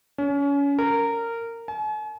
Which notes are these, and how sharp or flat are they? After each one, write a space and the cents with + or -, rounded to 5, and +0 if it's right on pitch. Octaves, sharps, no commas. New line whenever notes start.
C#4 +30
A#4 -15
G#5 +45